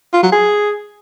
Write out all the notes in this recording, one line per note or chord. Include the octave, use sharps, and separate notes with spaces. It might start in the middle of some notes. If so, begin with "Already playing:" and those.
F4
F#3
G#4